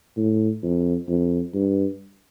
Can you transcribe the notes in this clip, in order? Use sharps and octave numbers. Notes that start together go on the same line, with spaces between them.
A2
F2
F2
G2